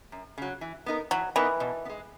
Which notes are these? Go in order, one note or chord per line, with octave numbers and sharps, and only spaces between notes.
F#2
C#3 F#3
E3
B3 D#4 A#4
E3 F#3
E3 B3 D#4 A#4
B2
B3
G#3